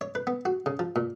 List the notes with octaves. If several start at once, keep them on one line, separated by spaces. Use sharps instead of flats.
C#5
B4
B3
F#4
C#3
F3
A#2